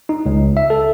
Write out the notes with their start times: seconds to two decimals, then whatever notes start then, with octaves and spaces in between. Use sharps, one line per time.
0.09 D#4
0.26 C#2
0.57 E5
0.70 A4